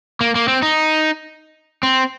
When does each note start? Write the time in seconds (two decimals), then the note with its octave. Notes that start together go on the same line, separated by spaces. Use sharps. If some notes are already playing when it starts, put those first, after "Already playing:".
0.21 A#3
0.35 A#3
0.48 C4
0.62 D#4
1.83 C4